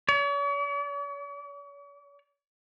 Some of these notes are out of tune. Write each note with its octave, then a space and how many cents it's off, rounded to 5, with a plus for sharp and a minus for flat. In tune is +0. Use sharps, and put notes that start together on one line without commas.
C#5 +45